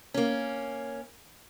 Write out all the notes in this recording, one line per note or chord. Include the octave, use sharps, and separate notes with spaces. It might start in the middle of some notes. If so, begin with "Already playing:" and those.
A#3 C#4